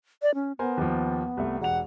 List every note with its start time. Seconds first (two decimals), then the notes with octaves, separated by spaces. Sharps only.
0.22 D5
0.34 C#4
0.59 B3 A#4 C5 G#5
0.78 D#2 F3
1.37 C2 A3
1.61 E1 F#5 F7